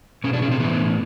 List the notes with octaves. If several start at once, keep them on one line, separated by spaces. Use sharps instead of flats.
B2 C#4
D4
C#4
C4
A2 E3 B3